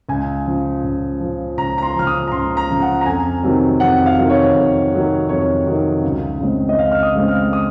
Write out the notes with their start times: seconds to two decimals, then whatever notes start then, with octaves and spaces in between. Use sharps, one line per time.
0.09 C#2 G#5
0.46 C#3 F3
0.84 C#2
1.20 C#3 F3
1.57 C#2 A#5
1.78 A#5
1.83 C6
1.95 C#3 F3 F6
2.07 D#6
2.27 A#5
2.32 C#2 C6
2.57 A#5
2.69 C#3 F3
2.82 F#5
3.01 A#5
3.06 F2 G#5
3.43 C3 D#3 F#3
3.80 F2 F#5
4.06 F5
4.18 C3 D#3 F#3
4.30 C#5
4.55 F2
4.92 C3 D#3 F#3
5.29 F2 C#5
5.66 C3 D#3 F#3
6.03 C#2
6.40 C#3 G#3 C4
6.69 D#5
6.78 C#2 F5
6.92 F6
7.03 D#6
7.15 C#3 G#3 C4
7.28 F6
7.53 D#6